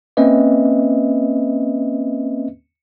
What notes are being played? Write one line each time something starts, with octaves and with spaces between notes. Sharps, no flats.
A#3 C4 C#4 B4 D#5 E5